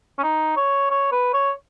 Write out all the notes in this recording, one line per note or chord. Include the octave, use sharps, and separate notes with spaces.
C#4
D#4
C#5
C#5
B4
C#5